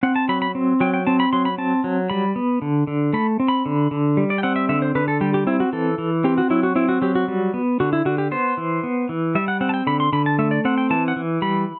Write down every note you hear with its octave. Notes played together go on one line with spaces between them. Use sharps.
C4 F#5
A5
F#3 B5
B5
C4
F#3 G5
G5
C4 A5
B5
F#3 C6
B5
C4 A5
F#3
G3 B5
B3
D3
D3
A3 B5
C4
B5
D3
D3
G3
D5
G5
C4 F#5
E5
D3 E5
C5
D3 B4
A4
G3 G4
G4
C4 E4
F#4
E3 A4
E3
C4 G4
F#4
F#3 E4
F#4
C4 E4
F#4
F#3 G4
F#4
G3
B3
D3 F#4
E4
D3 F#4
G4
B3 C5
E3
B3
E3
G3 E5
F#5
C4 F#5
A5
G5
D3 B5
C6
D3 B5
A5
A3 E5
D5
C4 F#5
G5
E3 A5
F#5
E3
G3 B5